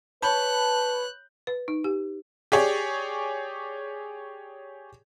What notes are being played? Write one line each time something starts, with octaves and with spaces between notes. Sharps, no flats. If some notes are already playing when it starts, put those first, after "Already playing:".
B4 C#5 A5 B5 F#6 G6
B4
D#4
G4
G4 G#4 C#5 D5